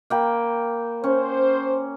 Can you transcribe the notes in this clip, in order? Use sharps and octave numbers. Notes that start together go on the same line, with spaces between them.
A#3 G5 B5
C#4 C5